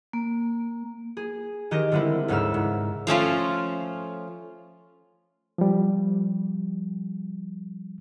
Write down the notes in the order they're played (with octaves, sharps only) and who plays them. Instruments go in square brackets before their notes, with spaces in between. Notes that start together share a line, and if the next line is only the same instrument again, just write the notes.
[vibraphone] A#3
[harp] G#4
D#3 G4 D#5 G6 A#6
D3 G3 G#3 C4 E4
D2 G#2 C#3 G#3 E6 F6
G#2
[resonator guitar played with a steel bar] F3 A3 C#4 F4
[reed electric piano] F3 G3